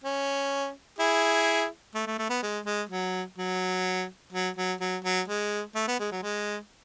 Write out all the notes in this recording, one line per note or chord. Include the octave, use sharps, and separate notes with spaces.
C#4
E4 G#4
A3
A3
A3
B3
G#3
G#3
F#3
F#3
F#3
F#3
F#3
F#3
G#3
A3
B3
G#3
F#3
G#3